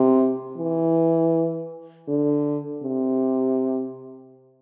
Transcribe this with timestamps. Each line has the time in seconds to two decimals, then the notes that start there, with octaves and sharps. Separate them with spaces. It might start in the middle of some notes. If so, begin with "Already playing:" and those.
Already playing: C3
0.57 E3
2.08 D3
2.83 C3